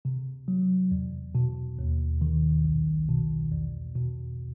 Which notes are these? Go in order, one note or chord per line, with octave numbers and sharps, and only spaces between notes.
C3
F#3
E2
B2
D#2
D#3
B1
B2
E2
B2